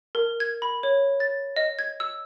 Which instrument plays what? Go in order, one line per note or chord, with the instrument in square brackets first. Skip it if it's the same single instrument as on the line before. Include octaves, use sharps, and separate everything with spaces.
[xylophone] A#4
G#6
B5
C#5
A6
D#5
G#6
E6